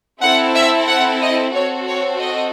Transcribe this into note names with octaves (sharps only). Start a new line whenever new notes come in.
C4 E4 A4 F#5
E5
F#5
D#5
C4 F#4 A4 C#5
C#5
D#5